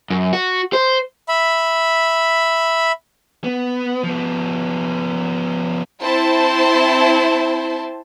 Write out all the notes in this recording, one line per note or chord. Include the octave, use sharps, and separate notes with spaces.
F#2
F#4
C5
E5 B5
B3
F3 B3
C4 E4 C5 A5